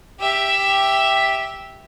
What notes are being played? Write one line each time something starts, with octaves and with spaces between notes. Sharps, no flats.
G4 E5